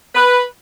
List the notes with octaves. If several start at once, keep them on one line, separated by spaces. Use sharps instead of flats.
B4